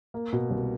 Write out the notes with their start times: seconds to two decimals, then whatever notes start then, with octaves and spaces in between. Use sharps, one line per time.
0.14 A#3
0.33 B2
0.50 C2